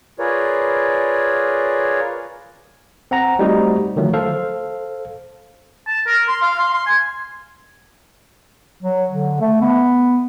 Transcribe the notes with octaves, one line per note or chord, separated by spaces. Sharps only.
F4 G#4 A#4 B4 C#5 D5
C4 F#5 A#5
G3 A3 C4 D#4 F#4 C5
D3 D#3 F3 F#3 A3
A4 C5 F5
A5
A#4
C6
F5
C6
C6
G#5
F#3
D3
A3
B3